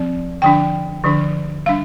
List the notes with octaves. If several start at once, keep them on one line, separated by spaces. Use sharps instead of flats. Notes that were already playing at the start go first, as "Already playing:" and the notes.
Already playing: F3 C4
D3 F3 D4 G5
D3 F3 D4
G3 D4 F5